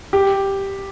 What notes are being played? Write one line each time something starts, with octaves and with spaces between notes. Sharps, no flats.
G4